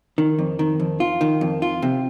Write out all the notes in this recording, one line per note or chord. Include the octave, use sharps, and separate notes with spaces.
D#3
F2
D#3
F2
F4
D#3
F2
F4
C3